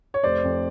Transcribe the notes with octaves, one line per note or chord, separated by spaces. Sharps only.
C#5
F1 C5 D5
F2